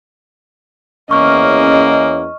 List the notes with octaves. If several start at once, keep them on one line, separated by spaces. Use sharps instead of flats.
E2 A#3 C#4 D#5 C#6 F6